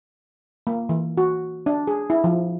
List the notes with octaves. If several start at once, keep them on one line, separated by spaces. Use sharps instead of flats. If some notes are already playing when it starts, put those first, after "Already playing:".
A#3
E3
F#4
D4
G#4
E4
F3